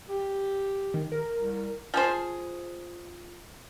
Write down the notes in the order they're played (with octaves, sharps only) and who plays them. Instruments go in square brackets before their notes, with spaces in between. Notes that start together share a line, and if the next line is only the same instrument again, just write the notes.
[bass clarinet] G4
[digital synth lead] D#3
A#4
[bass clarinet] C2
[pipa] F3 G#4 C5